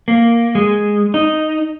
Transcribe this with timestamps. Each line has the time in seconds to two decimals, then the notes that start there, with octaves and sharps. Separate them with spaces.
0.08 A#3
0.55 G#3
1.14 D#4